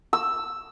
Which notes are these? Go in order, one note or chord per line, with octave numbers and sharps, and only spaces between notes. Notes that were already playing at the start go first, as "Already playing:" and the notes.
E6